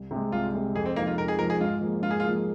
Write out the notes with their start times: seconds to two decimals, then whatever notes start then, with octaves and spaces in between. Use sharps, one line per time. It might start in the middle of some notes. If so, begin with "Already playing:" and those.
Already playing: C2
0.11 C3 G#3
0.32 C2 F4
0.53 C3 G#3
0.75 F2 G#4
0.86 C4
0.96 F3 G#3 A#3 D#4
1.07 F4
1.17 F2 A#4
1.28 G#4
1.38 F3 G#3 D#4 A#4
1.50 G#4
1.60 G#2 F4
1.81 F3 A#3 G#4
2.02 G#2 F4
2.11 G#4
2.20 F4
2.24 F3 A#3 G#4